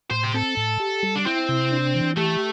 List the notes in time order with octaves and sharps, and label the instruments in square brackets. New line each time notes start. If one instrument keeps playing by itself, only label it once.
[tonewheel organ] A2 [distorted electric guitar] C5
[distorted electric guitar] G4
[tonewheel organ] C4 [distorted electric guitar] A4
[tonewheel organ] A2
G4
G3
[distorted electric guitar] D4
[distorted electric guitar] C4 [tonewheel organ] E4
[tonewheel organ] C3
D4
E3
[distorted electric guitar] A3 [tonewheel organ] G4